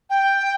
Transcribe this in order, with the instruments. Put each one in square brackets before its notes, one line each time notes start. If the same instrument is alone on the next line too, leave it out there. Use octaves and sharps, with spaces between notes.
[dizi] G5